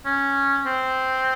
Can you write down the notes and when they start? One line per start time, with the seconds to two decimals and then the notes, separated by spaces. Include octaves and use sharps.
0.05 C#4
0.66 C4